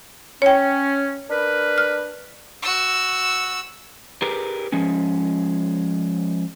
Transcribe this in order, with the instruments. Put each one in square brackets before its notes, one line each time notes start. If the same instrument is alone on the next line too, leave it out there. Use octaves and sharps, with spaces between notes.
[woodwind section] C#4 [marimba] C#5 G5
[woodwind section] D4 A#4 B4
[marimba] F6
[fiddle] F#4 E6
[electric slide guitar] G4 G#4 A#4 B4
F3 G#3 C#4